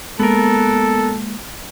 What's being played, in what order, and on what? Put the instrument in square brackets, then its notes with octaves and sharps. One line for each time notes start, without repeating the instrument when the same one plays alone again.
[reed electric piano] G#3 A#3 [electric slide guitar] B3 A#4 [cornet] A4